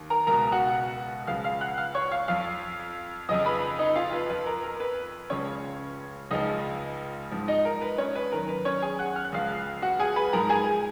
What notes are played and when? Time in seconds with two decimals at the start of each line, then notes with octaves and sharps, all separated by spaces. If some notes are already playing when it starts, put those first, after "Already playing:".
Already playing: D#2
0.10 A#4 A#5
0.27 C#2 B2 A#4 A#5
0.52 F#4 F#5
1.27 C#2 C#3 F3 F5 F6
1.44 F5 F6
1.61 F#5 F#6
1.78 F5 F6
1.95 C#5 C#6
2.12 F5 F6
2.28 F2 F3 F5 F6
3.29 F2 C#3 F3 D#5 D#6
3.46 B4 B5
3.79 D#4 D#5
3.96 F4 F5
4.13 B4
4.30 F2 F3 B4
4.46 A#4
4.63 A#4
4.80 B4
5.30 C#2 C#3 F3 C#4 C#5
6.31 C#2 C#3 F3 D#4 D#5
7.31 G#2 F3
7.48 D#4 D#5
7.65 A#4
7.81 B4
7.98 C#4 C#5
8.15 B4
8.32 F#2 D#3 A#4
8.49 B4
8.65 C#4 C#5
8.82 G#4 G#5
8.99 F#5 F#6
9.16 F6
9.25 F#6
9.32 C#2 C#3 F3 F5 F6
9.82 F#4 F#5
9.99 G#4 G#5
10.16 B4 B5
10.33 G#2 F3 A#4 A#5
10.49 G#4 G#5